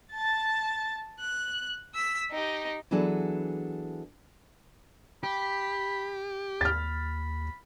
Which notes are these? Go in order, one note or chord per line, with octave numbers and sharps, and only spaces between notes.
A5 A6
F#6
E6 B6
D#4 G4
E3 F#3 B3 D4 G#4 A4
G4 B5
D#2 B5 F6 A6